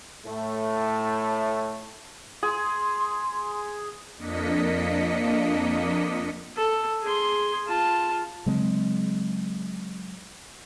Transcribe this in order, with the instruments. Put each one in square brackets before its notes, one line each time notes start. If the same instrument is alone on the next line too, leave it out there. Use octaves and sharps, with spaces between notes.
[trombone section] A2 A3
[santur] G#4 [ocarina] C6
[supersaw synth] F2 A#3 D4 D#5 B6 C#7
[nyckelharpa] A4
G#4 C6
F4 A5
[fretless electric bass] C#3 F#3 G#3 C4